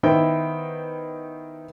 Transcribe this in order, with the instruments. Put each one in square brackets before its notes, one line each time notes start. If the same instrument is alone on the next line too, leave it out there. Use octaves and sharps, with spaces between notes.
[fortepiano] D#3 B3 E4 C5 G5